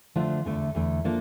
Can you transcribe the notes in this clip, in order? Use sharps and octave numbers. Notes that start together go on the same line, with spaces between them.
D3 F3 A3 D4 F4
E2 D3 A3
E2 D3 A3
F3 A#3 D4 A4